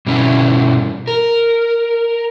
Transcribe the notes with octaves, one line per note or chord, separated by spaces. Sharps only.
G2 B2 C#4 D4 E4
A#4